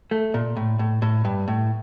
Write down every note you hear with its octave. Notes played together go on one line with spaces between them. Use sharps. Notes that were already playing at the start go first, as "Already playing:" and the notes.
A3
A#2
A2
A2
A2
G2
A2